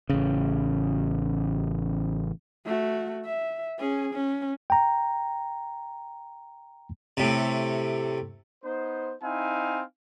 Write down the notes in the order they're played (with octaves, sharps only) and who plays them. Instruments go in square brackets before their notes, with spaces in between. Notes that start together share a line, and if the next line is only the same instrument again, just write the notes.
[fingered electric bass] A1 C#3
[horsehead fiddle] A3 F#4
E5
C#4 G#4
C#4
[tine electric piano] G5 A#5
[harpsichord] A2 C3
[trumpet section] B3 D#4 C5
C4 D#4 E4 F5 G#5